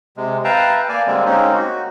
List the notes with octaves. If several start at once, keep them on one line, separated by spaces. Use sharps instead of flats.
C3 G#3
B4 E5 F5 G5 A5 A#5
A#3 D5 G#5
D3 G3 G#3 A#3 C4
G#3 A#3 C4 C#4 D#4
F#4